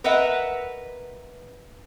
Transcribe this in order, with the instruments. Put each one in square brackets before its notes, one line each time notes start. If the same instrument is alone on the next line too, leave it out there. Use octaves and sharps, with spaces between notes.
[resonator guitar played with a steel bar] A#4 B4 D#5 E5 F#5